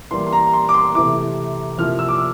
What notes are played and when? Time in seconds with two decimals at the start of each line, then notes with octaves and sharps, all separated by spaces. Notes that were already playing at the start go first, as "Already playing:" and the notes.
0.11 E3 G3 A#3 C6
0.27 C6
0.33 A#5
0.53 C6
0.69 D6
0.74 C6
0.95 C3 E3 A3 E4 D6
1.78 C3 F3 A#3 E4 F6
1.99 E6
2.09 D6
2.18 E6